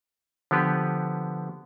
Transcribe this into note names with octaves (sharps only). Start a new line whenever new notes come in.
D3 F3 B3 G4 B4